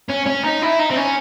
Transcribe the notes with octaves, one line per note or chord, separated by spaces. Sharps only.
C#4
C#4
D#4
E4
D#4
C4
C#4